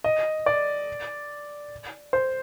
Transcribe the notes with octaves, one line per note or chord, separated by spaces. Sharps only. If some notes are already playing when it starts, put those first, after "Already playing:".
D#5
D5
C5